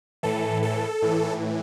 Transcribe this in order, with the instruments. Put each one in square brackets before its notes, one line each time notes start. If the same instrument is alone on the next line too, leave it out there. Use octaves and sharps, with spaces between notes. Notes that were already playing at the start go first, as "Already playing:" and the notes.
[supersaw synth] A2 E3 A4
A4
A2 E3